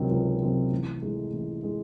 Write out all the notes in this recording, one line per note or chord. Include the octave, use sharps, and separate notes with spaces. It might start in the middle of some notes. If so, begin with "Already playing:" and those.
Already playing: C#2 C3 D#3 F#3 C4
C#2
C3 D#3 F#3 C4
A1
A2 G#3
A1
A2 G#3